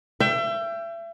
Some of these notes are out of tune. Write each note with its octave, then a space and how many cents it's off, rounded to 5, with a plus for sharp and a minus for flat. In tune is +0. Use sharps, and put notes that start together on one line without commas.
E5 +35 G5 +0